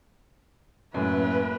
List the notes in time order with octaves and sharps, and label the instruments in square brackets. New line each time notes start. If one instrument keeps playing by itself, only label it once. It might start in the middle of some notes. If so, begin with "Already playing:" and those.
[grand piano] F#2 A2 [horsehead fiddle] A#3 B4